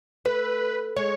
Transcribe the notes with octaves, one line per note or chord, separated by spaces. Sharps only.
A3 B4
G#3 C#5